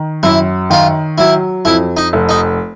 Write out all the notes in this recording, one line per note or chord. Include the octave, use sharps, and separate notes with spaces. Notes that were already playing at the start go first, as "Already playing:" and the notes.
Already playing: D#3
F#2 E4
D#3 F4
F#3 E4
F2 E4
D#4
F1
D#4